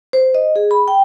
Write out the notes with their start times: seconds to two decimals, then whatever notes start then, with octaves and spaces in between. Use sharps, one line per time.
0.13 C5
0.35 D#5
0.56 G#4
0.71 B5
0.88 G5